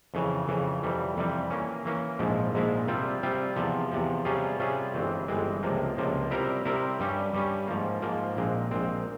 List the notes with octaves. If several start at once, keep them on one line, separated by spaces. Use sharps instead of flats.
F2 C#3 E3
F2 C#3 E3
F2 C3 E3 G3
F2 C3 E3 G3
E3 A#3 C#4
E3 A#3 C#4
A#1 G#2 F3 G#3 E4
A#1 G#2 F3 G#3 E4
C3 G3 C4 F4
C3 G3 C4 F4
E2 C3 F3
E2 C3 F3
C3 G3 C#4 F4 G#4
C3 G3 C#4 F4 G#4
G1 G2 E3 G#3 C4
G1 G2 E3 G#3 C4
C#2 C3 F3 A#3
C#2 C3 F3 A#3
C3 G3 C4 E4 A#4
C3 G3 C4 E4 A#4
G2 G3 C#4
G2 G3 C#4
G#2 F3 A#3
G#2 F3 A#3
A#1 A#2 G#3 C4
A#1 A#2 G#3 C4